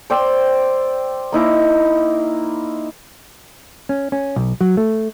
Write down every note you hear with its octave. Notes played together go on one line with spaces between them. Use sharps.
C5 D5 G5 E6
A#3 D#4 E4 A#5
C#4
C#4
B1
F#3
A3